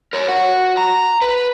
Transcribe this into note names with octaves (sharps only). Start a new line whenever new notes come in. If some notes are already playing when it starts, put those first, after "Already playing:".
A#4 C#5
F#4 F#5
A#5
B4